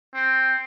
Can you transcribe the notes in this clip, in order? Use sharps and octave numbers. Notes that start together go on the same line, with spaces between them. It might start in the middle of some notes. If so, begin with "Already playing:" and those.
C4